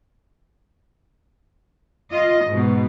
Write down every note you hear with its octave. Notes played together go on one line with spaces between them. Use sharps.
F4 D#5
G#2 B2